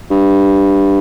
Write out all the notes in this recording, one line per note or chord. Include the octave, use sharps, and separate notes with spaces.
G2